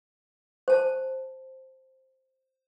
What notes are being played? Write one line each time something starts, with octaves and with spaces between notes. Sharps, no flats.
C5 A5